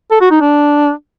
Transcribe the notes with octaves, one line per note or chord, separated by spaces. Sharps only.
A4
F#4
D#4
D4